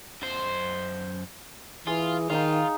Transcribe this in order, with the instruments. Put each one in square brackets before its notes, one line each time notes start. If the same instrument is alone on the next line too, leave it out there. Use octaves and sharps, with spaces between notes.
[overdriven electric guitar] F#2 C5
[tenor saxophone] E3 [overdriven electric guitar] F4 [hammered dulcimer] G#4
[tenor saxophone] D#3 [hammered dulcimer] D#4 F5 [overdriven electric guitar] F4